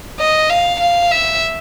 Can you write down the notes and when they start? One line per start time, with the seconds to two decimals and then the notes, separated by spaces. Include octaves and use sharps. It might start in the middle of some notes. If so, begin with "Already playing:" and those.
0.20 D#5
0.50 F5
0.81 F5
1.12 E5